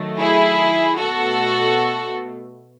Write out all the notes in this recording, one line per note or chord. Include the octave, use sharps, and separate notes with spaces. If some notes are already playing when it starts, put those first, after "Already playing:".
Already playing: D#3 F#3 A3
E4 G#4
B2 A3 F#4 A4